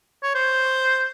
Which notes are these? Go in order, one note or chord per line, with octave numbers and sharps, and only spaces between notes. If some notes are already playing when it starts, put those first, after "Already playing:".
C#5
C5